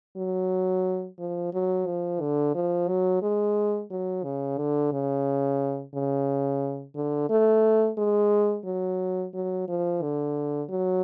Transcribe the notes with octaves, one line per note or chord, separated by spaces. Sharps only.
F#3
F3
F#3
F3
D3
F3
F#3
G#3
F#3
C#3
D3
C#3
C#3
D3
A3
G#3
F#3
F#3
F3
D3
F#3